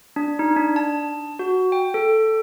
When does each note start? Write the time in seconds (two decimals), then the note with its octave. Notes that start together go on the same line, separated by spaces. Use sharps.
0.16 D4
0.39 D#4
0.57 D4
0.76 A5
1.39 F#4
1.72 G5
1.94 A4